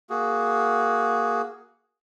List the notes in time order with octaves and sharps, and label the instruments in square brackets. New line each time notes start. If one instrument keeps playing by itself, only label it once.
[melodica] A#3 F#4 G#4